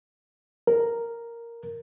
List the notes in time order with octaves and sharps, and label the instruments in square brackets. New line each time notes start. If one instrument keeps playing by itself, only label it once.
[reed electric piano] A#4